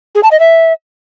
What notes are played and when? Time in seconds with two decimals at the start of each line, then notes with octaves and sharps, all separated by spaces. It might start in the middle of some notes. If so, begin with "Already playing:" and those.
0.15 G#4
0.23 A5
0.31 D#5
0.40 E5